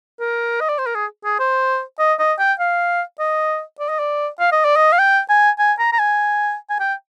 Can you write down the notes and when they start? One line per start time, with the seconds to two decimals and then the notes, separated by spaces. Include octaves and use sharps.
0.20 A#4
0.60 D#5
0.69 D5
0.78 C5
0.86 A#4
0.95 G#4
1.24 G#4
1.39 C5
1.99 D#5
2.19 D#5
2.39 G5
2.59 F5
3.19 D#5
3.80 D5
3.89 D#5
3.99 D5
4.40 F5
4.52 D#5
4.65 D5
4.76 D#5
4.92 F5
4.99 G5
5.29 G#5
5.59 G#5
5.79 A#5
5.93 A#5
5.99 G#5
6.70 G#5
6.80 G5